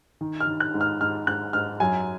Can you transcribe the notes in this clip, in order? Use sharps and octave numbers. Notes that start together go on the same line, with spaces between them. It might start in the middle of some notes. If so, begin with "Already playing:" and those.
D#3
F6
D#3
F#6
G#2
F6
G#2 F6
G#2 F#6
G#2 F6
F#2 G#5